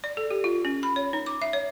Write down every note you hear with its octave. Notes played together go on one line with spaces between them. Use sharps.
D5
A4
G4
F4
C#4
B5
C#5
D#4
D6
E5
C#5